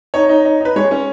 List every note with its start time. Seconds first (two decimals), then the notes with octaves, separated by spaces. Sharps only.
0.14 D#4 C#5
0.29 D#4
0.45 D#4
0.61 D#4 B4
0.76 G#3 C#5
0.91 C#4